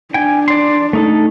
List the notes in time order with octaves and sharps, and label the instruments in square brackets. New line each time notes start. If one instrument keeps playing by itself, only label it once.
[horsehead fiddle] D4 [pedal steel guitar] G5 G#5
[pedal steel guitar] D5 C6
A3 D#4 A4